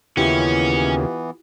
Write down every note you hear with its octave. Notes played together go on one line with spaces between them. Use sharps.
D#2 C#3 E3 B3 C#4 E4 F4 G4